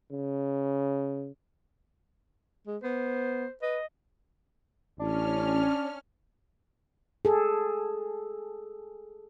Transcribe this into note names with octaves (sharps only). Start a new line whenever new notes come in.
C#3
G#3
B3 C5
B4 D#5
A1 C#4 D4 F6
G#4 A4